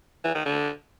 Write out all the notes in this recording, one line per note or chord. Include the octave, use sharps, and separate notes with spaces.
E3
D#3
D3